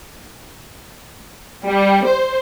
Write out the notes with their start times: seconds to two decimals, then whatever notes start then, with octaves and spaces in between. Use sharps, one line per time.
1.66 G3
2.05 C5